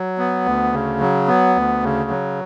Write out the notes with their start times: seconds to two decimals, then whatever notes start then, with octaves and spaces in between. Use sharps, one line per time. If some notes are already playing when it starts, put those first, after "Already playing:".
Already playing: F#3
0.18 B3
0.45 D2
0.73 C#3
1.01 F#3
1.27 B3
1.55 D2
1.83 C#3
2.10 F#3